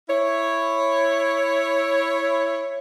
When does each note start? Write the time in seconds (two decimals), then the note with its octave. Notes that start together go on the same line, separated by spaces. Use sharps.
0.09 E4 C#5